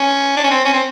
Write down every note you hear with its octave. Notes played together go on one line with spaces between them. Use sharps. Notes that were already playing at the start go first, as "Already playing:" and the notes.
Already playing: C#4
D4
C#4
C4
C#4
C4